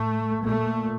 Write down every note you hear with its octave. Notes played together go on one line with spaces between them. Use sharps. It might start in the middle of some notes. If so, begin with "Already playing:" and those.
Already playing: A2 A3
A#2 A3